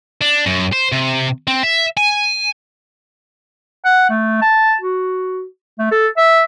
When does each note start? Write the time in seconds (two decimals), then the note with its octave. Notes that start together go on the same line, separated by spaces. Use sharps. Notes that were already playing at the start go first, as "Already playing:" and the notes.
0.21 D4
0.46 F#2
0.73 C5
0.92 C3
1.47 C4
1.63 E5
1.97 G#5
3.85 F#5
4.10 A3
4.42 A5
4.81 F#4
5.79 A3
5.91 A4
6.17 E5